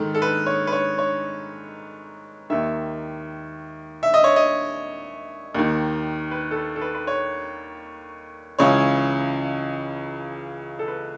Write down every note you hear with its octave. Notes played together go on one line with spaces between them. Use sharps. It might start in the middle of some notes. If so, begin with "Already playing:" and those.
Already playing: G#2 D#3 A4
A4
B4
C#5
B4
C#5
C#5
D#2 D#3 E5
E5
D#5
C#5
D#5
D#2 D#3
B4
A4
B4
A4
B4
B4
C#5
C#2 C#3 E3 C#5
A4
B4